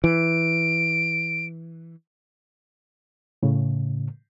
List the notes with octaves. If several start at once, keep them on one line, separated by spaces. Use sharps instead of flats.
E3 D7
A2 C#3